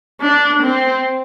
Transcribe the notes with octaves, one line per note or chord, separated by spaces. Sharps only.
D4
C4